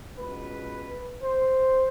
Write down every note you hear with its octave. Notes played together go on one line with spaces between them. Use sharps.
C#2 B2 B4
C5